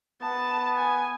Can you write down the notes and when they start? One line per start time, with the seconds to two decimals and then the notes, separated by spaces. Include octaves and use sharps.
0.21 B3 A5
0.77 G#5